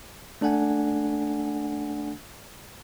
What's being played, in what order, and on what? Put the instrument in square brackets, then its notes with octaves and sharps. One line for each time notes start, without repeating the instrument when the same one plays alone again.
[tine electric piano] A3 D4 A4 F#5 G#5